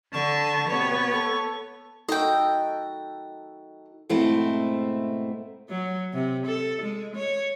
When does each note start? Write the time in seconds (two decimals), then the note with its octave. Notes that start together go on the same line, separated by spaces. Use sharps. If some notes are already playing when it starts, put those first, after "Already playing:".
0.13 D3 A5 C#6
0.69 B2 B3 C4 G4 C#5
1.11 A4 C#6
2.09 D#4 F#4 A4 D#5 G5
4.09 G#2 B2 A3 C4 E4
5.69 F#3
6.14 C3
6.46 A4
6.82 G#3
7.16 C#5